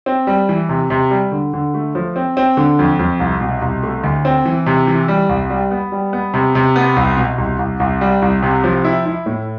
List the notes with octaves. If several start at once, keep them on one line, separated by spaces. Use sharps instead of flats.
C4
G3
E3
C3
C3
G3
D3
D3
A3
F3
C4
C4
D3
F2
F2
C2
B2
C2
A3
D2
C4
E3
C3
E3
G3
C2
G3
B3
G3
B3
C3
C3
B3
C2
B2
C2
C2
C2
G3
C2
C3
F3
E4
E4
A2